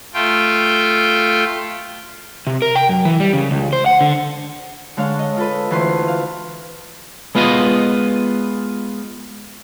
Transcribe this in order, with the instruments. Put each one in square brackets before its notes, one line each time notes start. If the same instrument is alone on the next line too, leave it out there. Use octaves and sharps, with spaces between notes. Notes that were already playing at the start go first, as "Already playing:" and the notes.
[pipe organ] A3 F4 G5
[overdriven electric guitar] C3
A#4
G5
F#2
E3
G3
C#3
C#2
C5
F#5
D3
[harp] D3 G#3 C#5 F5
D#5
F4 A4 B4
D2 E3 B4 C6
F5
[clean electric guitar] G#3 B3 F4 B4 D#5